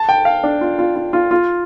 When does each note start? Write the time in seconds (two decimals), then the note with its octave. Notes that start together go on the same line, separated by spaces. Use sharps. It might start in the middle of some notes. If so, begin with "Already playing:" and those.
Already playing: A5
0.09 G5
0.25 F5
0.44 D4
0.61 F4
0.79 F4
0.96 F4
1.13 F4
1.31 F4